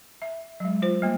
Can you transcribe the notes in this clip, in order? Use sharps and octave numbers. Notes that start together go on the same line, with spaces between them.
E5
F#3 G#3
F4 C5
G3 A#3